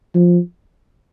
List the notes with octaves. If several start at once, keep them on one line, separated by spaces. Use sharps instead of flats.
F3